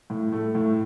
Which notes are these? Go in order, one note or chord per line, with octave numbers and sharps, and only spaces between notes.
A2
A3
A2